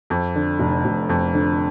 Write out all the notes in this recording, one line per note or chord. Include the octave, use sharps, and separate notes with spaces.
F2
D3
F1
F1
F2
D3